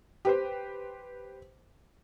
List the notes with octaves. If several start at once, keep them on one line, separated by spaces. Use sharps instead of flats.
G4 B4 C5